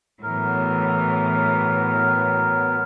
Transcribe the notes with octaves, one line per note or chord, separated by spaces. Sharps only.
A2 E3 F#3 B3 A#4